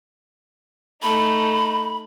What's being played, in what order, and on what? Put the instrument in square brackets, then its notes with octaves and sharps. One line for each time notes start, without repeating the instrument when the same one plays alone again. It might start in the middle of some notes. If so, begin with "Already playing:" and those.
[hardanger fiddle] A3 D#4 [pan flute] B5